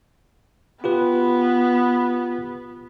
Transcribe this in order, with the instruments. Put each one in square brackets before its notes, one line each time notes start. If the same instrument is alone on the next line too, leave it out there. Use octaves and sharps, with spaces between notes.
[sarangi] B3 [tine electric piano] F4 G4 B4